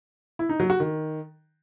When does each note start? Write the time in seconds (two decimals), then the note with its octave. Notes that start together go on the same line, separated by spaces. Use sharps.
0.39 E4
0.49 D#4
0.60 F#3
0.70 F#4
0.80 D#3